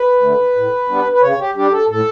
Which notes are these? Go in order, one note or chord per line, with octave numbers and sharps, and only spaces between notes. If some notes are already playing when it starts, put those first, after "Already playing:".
Already playing: B4
D3 A3
A2
G3 B3 D4
B4
C#3 C#5
G4
G3 D4 G4
A4
A2 A4